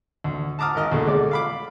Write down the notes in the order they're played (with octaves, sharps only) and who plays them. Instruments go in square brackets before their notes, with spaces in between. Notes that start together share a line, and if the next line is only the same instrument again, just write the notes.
[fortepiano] D2
A5 A#5 D6 D#6 F6
G#1 A#4 D#5 F6
D2 B2 A3
G#3 A3 D5
F5 B5 D6